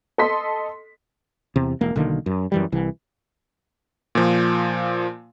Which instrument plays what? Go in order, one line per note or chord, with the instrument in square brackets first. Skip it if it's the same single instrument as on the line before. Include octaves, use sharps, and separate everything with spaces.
[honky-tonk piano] A4 D#5 C6 B6
[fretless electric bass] E2 C3
E1 A#3
B1 D3 D#3 A#3
F#2
F#2 E3 G3
C2 E3
[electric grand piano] A#2 F3